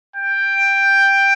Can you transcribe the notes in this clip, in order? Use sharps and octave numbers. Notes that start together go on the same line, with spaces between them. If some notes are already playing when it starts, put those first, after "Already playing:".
G5